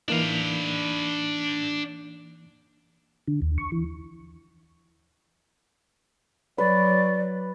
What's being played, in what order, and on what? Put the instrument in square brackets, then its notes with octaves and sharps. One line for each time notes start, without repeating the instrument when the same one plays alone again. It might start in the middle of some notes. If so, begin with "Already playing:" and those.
[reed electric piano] E3 A#3 D#4 [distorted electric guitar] D4 F5
[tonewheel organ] D3
D#2
C#6
E3
[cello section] F#3 [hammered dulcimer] B4 [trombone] C#5 [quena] D5